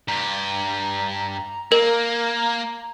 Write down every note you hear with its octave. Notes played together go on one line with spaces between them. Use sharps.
G2 G4 A#5
A#3 A#4